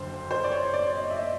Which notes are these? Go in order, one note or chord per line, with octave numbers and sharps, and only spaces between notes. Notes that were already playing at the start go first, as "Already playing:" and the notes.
Already playing: F#1 F2 D3 C5
C5
D5
C#5
D5
D#5
E5
D#5